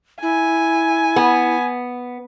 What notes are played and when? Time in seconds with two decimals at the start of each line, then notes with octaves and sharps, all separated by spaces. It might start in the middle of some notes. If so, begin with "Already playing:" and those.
0.22 E4 G#5
1.16 B3